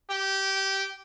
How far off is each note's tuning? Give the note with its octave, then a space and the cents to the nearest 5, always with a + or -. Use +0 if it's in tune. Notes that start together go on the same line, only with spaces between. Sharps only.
G4 -15